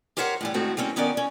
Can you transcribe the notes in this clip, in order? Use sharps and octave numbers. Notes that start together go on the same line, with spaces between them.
G4 A#4 C5 C#5 E5 F#5
A2 E3 G3
A2 D#3 G#3 A3 C4 F#4
G3 A#3 C4 C#4
D#3 B3 C#4 A#4 D5
C#4